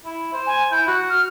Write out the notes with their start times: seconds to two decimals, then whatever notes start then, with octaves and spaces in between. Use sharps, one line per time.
0.05 E4
0.33 C5
0.47 G#5
0.71 E4 G6
0.87 F#4 F#6
1.09 F6